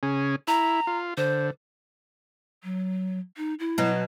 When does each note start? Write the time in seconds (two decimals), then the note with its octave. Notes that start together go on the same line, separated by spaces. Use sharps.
0.03 C#3 C#4 G#4
0.48 E4 A#5
0.87 F4
1.17 D3 C5
2.64 F#3
3.37 D#4
3.59 E4
3.78 B2 F#3